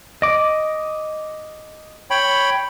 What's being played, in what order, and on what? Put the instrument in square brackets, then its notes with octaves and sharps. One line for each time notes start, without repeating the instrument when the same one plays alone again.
[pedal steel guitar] D#5 D6
[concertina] C#5 G5 B5